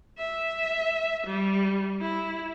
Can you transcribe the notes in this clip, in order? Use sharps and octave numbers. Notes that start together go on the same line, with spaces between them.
E5
G3
E4